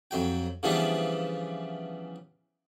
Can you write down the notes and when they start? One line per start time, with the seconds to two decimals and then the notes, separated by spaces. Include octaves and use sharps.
0.11 F2 F#3 G5
0.63 C#3 E3 F3 G3 B3 D4